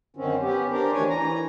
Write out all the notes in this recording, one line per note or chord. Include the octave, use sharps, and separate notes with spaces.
F#2 D3 D#3 C4 C#4
B3 C#4 G4
D4 G4 A#4 C5
D2 D#3 E3 D4 C#5 G#5
E3 A#5